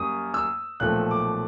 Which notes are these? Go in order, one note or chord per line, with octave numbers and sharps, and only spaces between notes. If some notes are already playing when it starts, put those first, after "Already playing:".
Already playing: F#2 G3 A#3 D#6
E6
B1 A#2 F3 A3 C4 F#6
D6